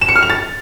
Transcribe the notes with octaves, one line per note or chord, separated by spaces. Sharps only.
E7
C#7
F6
F7
A6